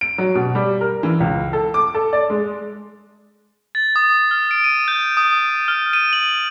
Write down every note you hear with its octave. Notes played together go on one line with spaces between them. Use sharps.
D7
F#3
B2
G3
A#4
E3
C#2
A4
D6
A4
D5
G#3
A6
D#6
F6
D7
D#7
G6
D#6
F6
D#7
F#7